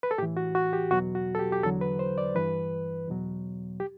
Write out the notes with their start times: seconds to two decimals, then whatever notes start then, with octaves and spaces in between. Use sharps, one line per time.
0.03 B4
0.11 A4
0.18 A2 E3 G4
0.37 F#4
0.55 F#4
0.73 G4
0.91 E2 B2 F#3 F#4
1.15 F#4
1.35 A4
1.39 G4
1.52 G4
1.63 E2 D3 F#3 A4
1.81 B4
1.99 C5
2.18 D5
2.35 G2 E3 B4
3.07 E2 B2 F#3
3.80 G4